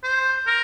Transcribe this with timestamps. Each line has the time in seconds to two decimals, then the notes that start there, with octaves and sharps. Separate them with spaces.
0.04 C5
0.47 A#4